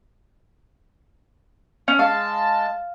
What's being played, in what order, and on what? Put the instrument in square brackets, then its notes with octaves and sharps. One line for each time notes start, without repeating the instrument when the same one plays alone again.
[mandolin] C#4
[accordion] G#3 A5 [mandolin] F5